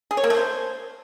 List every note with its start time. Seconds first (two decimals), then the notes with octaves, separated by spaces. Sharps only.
0.11 G#4
0.17 C#5
0.24 A#3
0.30 A3
0.37 C5